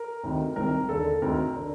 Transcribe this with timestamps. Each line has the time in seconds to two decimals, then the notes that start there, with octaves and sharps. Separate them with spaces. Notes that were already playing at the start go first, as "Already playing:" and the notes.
Already playing: A#4
0.23 D2 C3 D#3
0.56 C2 C3 D#3 A#4
0.89 D#2 D3 A4
1.22 D2 C3 D#3 A#4
1.55 D3